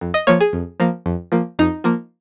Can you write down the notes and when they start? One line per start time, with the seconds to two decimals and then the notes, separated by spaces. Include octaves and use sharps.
0.01 F2
0.14 D#5
0.27 F3 A#3 C#5
0.41 G#4
0.53 F2
0.80 F3 A#3
1.06 F2
1.32 F3 A#3
1.59 F2 D#4
1.84 F3 A#3